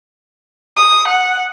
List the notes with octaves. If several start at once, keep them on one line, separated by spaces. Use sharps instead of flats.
D#6
F#5